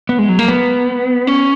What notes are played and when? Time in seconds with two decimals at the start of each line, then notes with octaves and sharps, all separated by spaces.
0.09 B3
0.19 G#3
0.29 F#3
0.39 A#3
0.48 B3
1.27 C#4